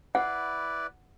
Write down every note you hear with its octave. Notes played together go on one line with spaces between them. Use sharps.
E4 B4 D5 F#5